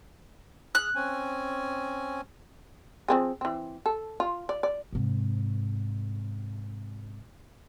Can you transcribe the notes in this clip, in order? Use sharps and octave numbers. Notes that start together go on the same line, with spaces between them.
G#4 F6 F#6
C4 C#4 G#5
F3 C4 G#4
E3 C4
A4
F4
D5
D5
G#2 C3